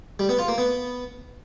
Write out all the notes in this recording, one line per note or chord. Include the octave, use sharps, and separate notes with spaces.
G3
B3
F4
A#3
B3